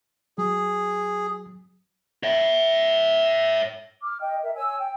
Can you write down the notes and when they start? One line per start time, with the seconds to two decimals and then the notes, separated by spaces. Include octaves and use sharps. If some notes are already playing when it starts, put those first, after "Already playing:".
0.38 F#3 G#4
2.24 C#5 E5
4.02 D6 F6
4.20 D#5 G5
4.42 A#4 E5
4.55 C#5 G#5 E6
4.79 G5